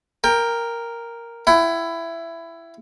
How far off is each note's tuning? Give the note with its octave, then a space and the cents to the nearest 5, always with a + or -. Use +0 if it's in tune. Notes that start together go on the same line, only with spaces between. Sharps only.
A#4 +0 G5 +20
E4 +15 F#5 +45